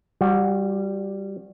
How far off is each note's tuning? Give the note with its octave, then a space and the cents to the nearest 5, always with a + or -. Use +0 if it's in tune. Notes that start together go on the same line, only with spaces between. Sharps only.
G3 +0 F#4 -30